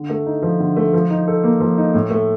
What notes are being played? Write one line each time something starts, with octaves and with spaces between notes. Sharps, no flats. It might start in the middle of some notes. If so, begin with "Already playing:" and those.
Already playing: D3
A3
D#4
F3
D3
A3
F3
D#4
A4
A#3
F3
D#4
A2
A3